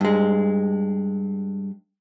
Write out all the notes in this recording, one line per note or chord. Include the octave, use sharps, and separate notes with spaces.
G2 G#3